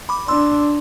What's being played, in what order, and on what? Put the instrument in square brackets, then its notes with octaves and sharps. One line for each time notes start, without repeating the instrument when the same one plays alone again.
[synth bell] B5 D6
[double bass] D4 [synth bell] C6 E6